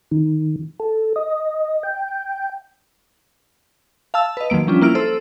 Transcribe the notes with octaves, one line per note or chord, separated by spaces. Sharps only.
D#3
A4
D#5
G5
F5 A5 E6
B4 D#5
D#3 F#3 A#3 D7
F3 G3 C#4 D4 F4
A#3 E4 F6 D7
A4 C5 E6